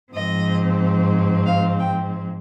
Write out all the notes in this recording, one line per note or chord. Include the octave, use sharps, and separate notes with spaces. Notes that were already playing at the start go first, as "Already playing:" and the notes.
G#2 F3 C4 D#5
F5
G5